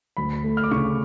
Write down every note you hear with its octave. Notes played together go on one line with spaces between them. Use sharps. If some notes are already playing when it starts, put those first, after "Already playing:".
D2 B5
A3
F6
D6
C#3 C#6